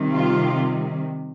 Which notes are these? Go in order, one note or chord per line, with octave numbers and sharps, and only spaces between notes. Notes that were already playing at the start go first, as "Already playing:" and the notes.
Already playing: C3 D#3 G3
F4